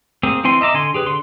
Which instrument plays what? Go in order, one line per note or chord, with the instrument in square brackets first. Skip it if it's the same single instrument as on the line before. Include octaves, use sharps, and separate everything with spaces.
[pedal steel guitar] A#3 C4 G#4
E3 C4 G#5 C6
D#5 E5 A#5 D6
D3 G#5 C6
G4 G#4 B4
D3 C6